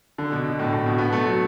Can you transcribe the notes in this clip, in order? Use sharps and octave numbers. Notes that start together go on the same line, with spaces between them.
D3
B2
B2
A2
A2
B2
B3
A3
F#3